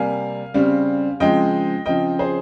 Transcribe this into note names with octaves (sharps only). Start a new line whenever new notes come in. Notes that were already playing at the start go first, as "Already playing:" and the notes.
Already playing: C3 G3 A#3 F5 G#5
C#3 G3 C4
C#3 F3 G#3 C4 D#5 G5
C#3 F3 C4 D#5 G5
G#4 C5